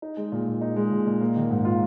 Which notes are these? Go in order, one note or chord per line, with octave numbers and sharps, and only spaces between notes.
D#4
G#3
A#2
A#2
D#4
G#3
A#2
A#2
A#3
D#3
G#2
F4